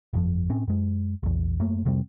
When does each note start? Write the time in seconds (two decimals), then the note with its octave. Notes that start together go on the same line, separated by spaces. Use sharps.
0.13 G1 F2 F3
0.49 A2 C4 C#4
0.68 F#2 G#3
1.23 A#1 E2
1.60 F#2 A3 A#3
1.85 F2 C3 G3 C4